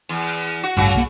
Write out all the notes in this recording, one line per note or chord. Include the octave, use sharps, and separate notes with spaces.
E2
F#4
A1 G2 C#3 F#4
B1 E3 A#3